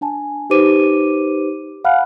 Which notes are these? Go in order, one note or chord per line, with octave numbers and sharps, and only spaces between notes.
D4 G#5 A5
D#4 G4 B4 C5 D6 D#7
F5 F#5 G#5 B5 F6 F#6